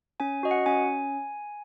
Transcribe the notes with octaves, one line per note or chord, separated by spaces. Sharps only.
C#4 G#5
F#4 D#5
F#5
C#4 G#5